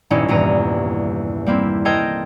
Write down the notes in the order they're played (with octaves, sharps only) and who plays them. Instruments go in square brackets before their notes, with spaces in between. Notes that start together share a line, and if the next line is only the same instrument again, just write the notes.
[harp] D#1 C2 G2 C#4 D#4 E4
D#1 E2 G2 A#5 D#7
G3 A#3 C4 E4
A4 A#4 C5 D#5 G5 G#6